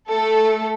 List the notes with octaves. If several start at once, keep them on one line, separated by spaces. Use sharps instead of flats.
A3 A4